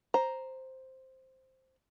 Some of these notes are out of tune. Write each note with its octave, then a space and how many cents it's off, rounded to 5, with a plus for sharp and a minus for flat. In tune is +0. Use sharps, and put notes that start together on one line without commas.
C5 +0 A#5 +0